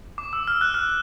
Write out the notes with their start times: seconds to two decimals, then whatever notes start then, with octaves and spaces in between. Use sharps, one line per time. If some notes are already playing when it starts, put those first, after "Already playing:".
0.18 D6
0.33 E6
0.48 F6
0.61 F#6
0.74 F6